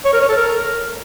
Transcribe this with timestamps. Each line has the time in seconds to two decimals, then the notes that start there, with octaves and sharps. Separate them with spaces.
0.05 C#5
0.13 A#4
0.21 C#5
0.29 A4
0.37 A#4